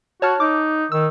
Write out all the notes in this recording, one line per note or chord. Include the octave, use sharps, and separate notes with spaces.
F#4 C#5 A5 F6
D#4 D6
D#3 E6